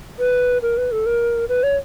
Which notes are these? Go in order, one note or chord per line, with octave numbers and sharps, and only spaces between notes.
B4
A#4
B4
A4
A#4
B4
C#5